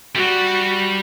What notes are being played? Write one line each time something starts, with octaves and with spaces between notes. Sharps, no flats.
G3 F#4